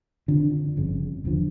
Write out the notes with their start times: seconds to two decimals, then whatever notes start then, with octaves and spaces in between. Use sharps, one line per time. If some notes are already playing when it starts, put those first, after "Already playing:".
0.28 F2 D3 F3
0.77 G1 F2 C#3
1.24 E1 E2 D3 F3